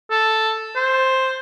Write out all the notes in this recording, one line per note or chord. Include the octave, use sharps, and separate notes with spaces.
A4
C5